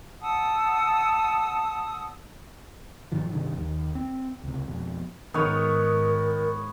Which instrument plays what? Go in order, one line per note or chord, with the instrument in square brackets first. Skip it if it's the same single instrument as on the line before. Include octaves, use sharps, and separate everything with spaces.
[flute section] F#5 A5 D#6 E6
[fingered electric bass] G2 A#2 D#3 F3
G2 C3 D#3
D#2 D#3
C4
C#2 C3
F2 B2
[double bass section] G#2 [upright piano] D#3 [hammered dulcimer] B3 C#5 [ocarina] A#4